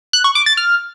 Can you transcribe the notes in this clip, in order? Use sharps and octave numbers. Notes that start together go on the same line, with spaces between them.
F#6
C#6
D6
A6
F6